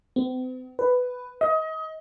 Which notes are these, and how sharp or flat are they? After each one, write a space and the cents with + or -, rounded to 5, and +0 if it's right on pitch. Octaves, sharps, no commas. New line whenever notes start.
C4 -45
B4 +10
D#5 +30